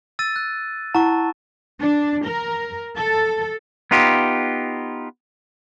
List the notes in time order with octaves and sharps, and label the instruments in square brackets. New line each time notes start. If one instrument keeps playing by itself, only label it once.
[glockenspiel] E6 A6 D#7
F#6
[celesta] E4 F#5 A#5 [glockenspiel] A5 C#6
[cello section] D4
A#4
A4
[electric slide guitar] B3 D#4 F4 G4